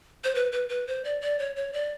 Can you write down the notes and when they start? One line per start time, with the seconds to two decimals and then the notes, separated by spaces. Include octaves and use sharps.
0.24 C5
0.35 B4
0.52 B4
0.69 B4
0.87 C5
1.04 D5
1.21 D5
1.39 C#5
1.56 C#5
1.73 D5